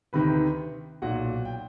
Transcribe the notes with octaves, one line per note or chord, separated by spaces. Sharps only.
D2 C3 D#3 B4 B5
B1 A#2 F#4 F#5
G5